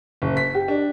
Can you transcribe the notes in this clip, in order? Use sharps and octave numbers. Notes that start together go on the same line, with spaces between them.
F#1
B6
G4
D4